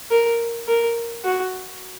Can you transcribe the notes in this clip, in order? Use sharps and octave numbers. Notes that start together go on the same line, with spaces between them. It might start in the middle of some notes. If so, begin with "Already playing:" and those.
A#4
A#4
F#4